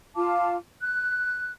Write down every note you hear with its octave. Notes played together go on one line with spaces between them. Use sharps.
F4 F5 A5 D6
F#6